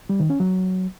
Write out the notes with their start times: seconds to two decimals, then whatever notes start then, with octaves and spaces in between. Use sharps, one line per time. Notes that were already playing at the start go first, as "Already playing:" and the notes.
0.10 G3
0.20 D#3
0.30 C#4
0.40 F#3